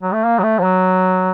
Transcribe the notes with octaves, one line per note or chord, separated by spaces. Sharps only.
F#3
A3
A#3
F#3
A3
F3
F#3